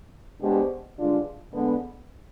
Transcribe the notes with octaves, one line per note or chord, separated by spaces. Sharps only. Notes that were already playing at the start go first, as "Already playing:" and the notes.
B2 G#3 D4 G4 C5
G2 D3 G#3 D4 F4
D3 G#3 B3